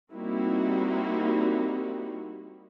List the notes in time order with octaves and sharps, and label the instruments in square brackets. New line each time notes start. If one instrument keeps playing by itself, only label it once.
[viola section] G3 A#3 C4 D#4 E4 F#4